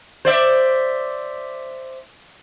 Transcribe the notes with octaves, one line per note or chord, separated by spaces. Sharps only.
C5 D5 E5